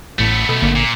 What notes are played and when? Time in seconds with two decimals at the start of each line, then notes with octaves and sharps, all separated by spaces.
0.19 A1 A2 A3 B3
0.49 B2 A4 B5
0.62 G#1 D3 A#3
0.76 A#2